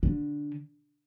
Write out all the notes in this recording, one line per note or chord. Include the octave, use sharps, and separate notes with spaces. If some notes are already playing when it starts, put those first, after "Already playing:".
D3